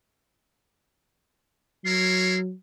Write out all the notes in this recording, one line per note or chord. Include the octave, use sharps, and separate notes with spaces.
F#3 E4 A#4 C#5 C7